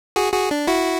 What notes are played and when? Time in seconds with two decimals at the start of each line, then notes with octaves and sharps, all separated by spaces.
0.16 F#4 G#4
0.33 F#4 G#4
0.51 D4
0.67 E4 F#4